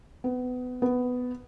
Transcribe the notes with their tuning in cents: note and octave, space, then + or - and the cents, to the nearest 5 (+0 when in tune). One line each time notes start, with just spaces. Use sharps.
B3 +25
B3 +10